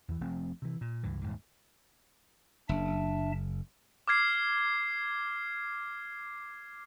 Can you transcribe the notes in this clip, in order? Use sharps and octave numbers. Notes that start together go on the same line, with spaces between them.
E2 E3
F1 F3 A3 C4
C3 E3
A#2
C#2 G2 E3
D#1 B1 G#2
F#1 D4 E5 A5
D6 F6 G#6 C7